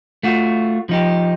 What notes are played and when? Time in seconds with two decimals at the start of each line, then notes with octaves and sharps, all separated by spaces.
0.23 A3 F4 F#4
0.89 F3 D#4 G4